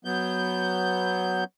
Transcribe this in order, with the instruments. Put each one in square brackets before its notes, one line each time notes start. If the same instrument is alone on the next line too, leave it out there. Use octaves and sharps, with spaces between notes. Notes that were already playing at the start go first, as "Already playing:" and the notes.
[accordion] F#3 B3 G6